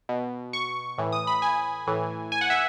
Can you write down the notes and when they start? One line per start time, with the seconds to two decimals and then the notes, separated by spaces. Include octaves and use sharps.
0.09 B2
0.53 C#6
0.98 A2 E3
1.12 D#6
1.27 B5
1.42 G#5
1.87 A2 E3
2.32 G#5
2.41 F#5
2.50 E5